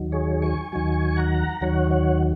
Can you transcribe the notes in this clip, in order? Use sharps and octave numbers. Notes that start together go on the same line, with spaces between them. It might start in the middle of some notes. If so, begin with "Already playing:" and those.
Already playing: D#2 D#3 F#3
G#4 C#5
G#5 C#6
D#2 D#3 F#3 G#5 C#6
F#5 A#5
D#2 D#3 F#3 C#5 F#5
C#5 F#5